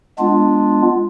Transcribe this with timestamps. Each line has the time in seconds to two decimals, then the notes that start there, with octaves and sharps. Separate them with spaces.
0.19 G#3 B3 D4 F4